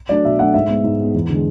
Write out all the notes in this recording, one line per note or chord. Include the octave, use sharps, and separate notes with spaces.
F#3 A3 D4 D5
B2 E5
F#3 A3 D4 F#5
G#2 E5
G#3 B3
G#2
G#3 B3
E2
D3 G#3